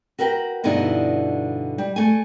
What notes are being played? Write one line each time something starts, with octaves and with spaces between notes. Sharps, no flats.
F#4 A#4 B4 G5
G2 B2 D3 D#4 E4
G3
A3 G#5